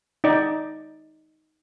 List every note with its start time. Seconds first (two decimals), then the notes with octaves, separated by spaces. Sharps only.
0.24 D#4 D5